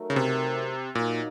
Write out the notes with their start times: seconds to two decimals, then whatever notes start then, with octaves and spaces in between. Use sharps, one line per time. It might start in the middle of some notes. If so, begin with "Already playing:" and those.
Already playing: F#3 A3 D#4 A#4
0.10 C#3
0.16 C3
0.95 A#2 F#3 A#3 D#4 A#4